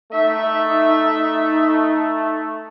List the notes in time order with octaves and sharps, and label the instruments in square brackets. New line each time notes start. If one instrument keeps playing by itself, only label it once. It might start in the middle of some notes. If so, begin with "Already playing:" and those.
[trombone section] A3 [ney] D#4 [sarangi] E5